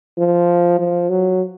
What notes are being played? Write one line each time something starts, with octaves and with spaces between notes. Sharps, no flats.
F3
F3
F#3